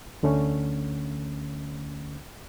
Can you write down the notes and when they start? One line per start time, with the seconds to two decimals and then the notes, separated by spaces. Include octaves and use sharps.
0.23 D2 D3 A3 C#4